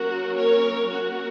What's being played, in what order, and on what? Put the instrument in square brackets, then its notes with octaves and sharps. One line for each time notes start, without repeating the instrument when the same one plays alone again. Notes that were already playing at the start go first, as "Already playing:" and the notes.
Already playing: [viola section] F#3 A#3 C#4 F#4 A#4
A#4 C#5
F#3 A#3 C#4 F#4 A#4